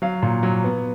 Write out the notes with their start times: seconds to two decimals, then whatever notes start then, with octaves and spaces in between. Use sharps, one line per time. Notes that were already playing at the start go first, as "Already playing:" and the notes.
0.02 F#3 F5
0.23 A#2
0.43 F#3
0.64 B3